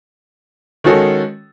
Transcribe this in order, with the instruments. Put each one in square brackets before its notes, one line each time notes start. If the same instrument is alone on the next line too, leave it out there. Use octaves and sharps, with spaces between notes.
[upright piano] D#3 G#3 C#4 F#4 A4